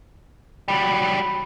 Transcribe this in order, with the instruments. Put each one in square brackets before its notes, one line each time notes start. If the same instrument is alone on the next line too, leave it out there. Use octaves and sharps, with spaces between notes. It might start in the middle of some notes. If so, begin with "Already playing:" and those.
[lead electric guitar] F#3 G3 [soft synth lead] B5